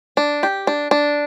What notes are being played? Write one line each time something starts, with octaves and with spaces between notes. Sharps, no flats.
D4
G4
D4
D4